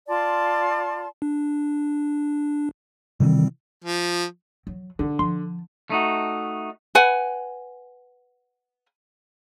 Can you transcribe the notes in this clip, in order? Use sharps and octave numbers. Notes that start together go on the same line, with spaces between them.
F4 D5 A5 C6
D4
C3 D#3 E3 G3 C4
F3
F#3
D3 D4
F3 C6
A3 D#4 F#4
B4 F#5 G#5